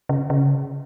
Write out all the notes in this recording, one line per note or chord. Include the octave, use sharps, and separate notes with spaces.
C#3
C#3